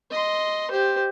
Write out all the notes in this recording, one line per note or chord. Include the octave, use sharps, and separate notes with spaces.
D#5 C6
G4 C5